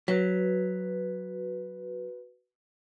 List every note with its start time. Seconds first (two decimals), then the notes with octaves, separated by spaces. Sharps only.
0.08 F#3 F#4 B4